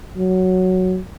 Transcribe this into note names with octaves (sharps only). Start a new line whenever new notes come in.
F#3